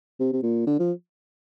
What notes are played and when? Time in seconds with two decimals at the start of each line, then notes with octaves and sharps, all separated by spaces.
0.19 C3
0.33 C3
0.43 A#2
0.67 D3
0.79 F3